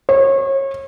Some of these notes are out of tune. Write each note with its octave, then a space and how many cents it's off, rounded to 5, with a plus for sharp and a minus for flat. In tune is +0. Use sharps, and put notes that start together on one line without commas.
C#5 -30